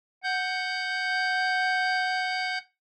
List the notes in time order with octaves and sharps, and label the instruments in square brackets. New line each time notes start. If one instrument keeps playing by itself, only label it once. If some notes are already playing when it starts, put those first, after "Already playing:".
[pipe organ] F#5 G6